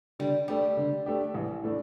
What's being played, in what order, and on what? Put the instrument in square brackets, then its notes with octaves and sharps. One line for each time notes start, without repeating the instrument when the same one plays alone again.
[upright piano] D3 [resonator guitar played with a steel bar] G3
[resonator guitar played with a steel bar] G3 [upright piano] A3 D4 G4
[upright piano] D3
A3 D4 G4
A1
A2 A3 D4